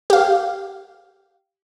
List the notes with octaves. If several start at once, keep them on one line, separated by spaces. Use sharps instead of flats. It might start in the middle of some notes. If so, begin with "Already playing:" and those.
G4 F5